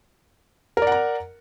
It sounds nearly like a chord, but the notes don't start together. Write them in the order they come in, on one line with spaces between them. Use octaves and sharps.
A#4 D5 F#5 A#5